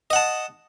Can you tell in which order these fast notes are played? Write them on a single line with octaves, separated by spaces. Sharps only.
D#5 F#5 A5